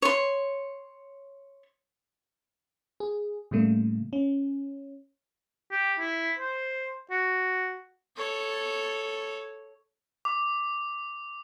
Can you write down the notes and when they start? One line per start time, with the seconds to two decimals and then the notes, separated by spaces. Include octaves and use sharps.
0.02 C#5 C6
3.00 G#4
3.51 A2 C#3 G3 A3 A#3
4.13 C#4
5.71 G4
6.00 E4
6.39 C5
7.11 F#4
8.16 A4 C#5
10.25 D6